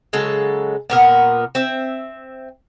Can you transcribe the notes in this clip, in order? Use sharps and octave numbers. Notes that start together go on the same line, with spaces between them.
C#3 F#3 G#3 A4
A#2 B3 A#4
C4 E5